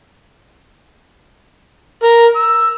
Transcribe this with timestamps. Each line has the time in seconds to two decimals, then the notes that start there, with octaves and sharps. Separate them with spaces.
2.03 A#4
2.36 E6